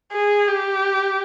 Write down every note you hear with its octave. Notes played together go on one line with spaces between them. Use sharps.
G#4
G4